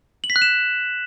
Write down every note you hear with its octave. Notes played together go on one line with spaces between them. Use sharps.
F#7
B6
F#6
E7